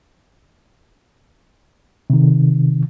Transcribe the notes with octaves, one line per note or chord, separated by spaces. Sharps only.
C3 D#3